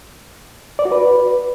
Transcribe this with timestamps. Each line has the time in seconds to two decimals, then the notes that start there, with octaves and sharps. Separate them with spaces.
0.79 D5
0.85 F#4
0.92 B4